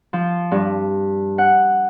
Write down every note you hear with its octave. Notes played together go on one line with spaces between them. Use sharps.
F3
G2
F#5